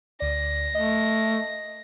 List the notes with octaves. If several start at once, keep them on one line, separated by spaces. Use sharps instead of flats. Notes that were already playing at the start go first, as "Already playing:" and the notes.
D2 D5 A#6
A3 D#5